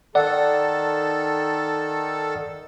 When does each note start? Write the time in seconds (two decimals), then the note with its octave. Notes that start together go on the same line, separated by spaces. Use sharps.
0.15 D#3 A4 D5 F#5